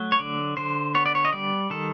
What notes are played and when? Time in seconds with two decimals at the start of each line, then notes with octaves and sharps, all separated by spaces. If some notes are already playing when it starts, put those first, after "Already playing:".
Already playing: F#3 A3
0.12 C#5
0.19 D3 D5
0.57 D3 C5
0.95 B3 C#5
1.06 D5
1.15 C#5
1.25 D#5
1.33 G3 D5
1.70 D#3 A4